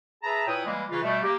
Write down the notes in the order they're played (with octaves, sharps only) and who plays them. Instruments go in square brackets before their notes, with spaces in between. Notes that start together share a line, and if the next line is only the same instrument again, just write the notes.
[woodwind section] G#4 B4 E5 A5 A#5
A#2 E4 B4 C#5 G5 D#6
E3 G3 G#3 A#3
C#3 E3 F4 B4
B2 G3 A3
A#3 G4